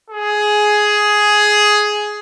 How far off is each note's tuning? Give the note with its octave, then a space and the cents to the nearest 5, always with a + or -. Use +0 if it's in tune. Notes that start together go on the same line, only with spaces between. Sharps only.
G#4 +10